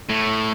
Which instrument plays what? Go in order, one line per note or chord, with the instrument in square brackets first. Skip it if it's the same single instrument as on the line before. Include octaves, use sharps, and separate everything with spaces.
[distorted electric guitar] A2